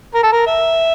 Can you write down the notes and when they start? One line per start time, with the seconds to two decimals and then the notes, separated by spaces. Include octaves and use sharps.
0.14 A#4
0.23 A4
0.32 A#4
0.47 E5